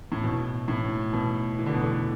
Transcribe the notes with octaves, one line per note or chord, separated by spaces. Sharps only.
A2
B2
A2
B2
E3
D3
B2
D3